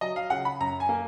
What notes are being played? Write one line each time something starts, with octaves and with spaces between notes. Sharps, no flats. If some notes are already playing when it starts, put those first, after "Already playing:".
F#3 D#5
F5
C#3 F#5
B5
F#2 A#5
G#5
A#3